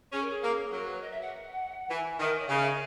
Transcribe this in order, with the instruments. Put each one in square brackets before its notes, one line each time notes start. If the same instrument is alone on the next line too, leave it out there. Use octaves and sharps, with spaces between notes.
[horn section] C#4 [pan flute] G#4
[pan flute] A#4
G#4
[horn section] A#3
[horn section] F#3 [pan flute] A#4
[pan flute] B4
D#5
E5
F#5
[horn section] E3 [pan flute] G#5
[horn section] D#3 [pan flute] E5
[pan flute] D#5
C#5
[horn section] C#3 [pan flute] D#5
[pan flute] E5
D#5